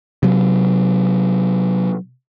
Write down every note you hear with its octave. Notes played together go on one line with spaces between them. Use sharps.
C3 F#3